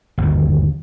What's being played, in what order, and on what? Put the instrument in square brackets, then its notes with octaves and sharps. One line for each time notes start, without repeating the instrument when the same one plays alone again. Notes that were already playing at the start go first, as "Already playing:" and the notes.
[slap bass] G1 D#2